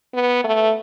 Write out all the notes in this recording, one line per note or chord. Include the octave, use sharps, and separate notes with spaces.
B3
A3